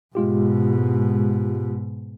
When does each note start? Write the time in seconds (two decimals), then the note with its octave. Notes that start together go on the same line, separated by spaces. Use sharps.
0.15 G#2 B2 G#3 F4 G4